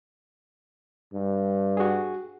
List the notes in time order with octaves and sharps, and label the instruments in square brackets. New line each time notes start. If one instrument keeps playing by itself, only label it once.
[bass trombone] G2
[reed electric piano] F#4 G#4